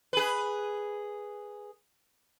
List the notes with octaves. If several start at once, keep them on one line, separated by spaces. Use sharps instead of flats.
G#4 B4